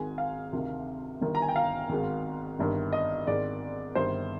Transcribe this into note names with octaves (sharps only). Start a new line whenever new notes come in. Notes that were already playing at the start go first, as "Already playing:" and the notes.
Already playing: G#1 G#2 D#3 G#5
F5
D2 C3 D#3
G1 G2 D#3
A#5
G#5
G5
F5
G#1 G#2 D#3
G1 G2 D#3
D#5
G#1 G#2 D#3 D5
G1 G2 D#3 C5